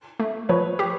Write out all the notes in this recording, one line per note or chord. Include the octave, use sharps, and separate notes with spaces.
A3
F3 B4 C#5
G4